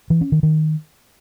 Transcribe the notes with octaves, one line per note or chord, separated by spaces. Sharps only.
E3
C#4
D#3
D#3